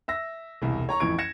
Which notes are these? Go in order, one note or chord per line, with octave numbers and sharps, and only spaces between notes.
E5 E6 A#6
E1 C2
C#5 A#5 C#6
A1 F2 E3 C#6 G#6 D7
G#6 A#6 C#7 E7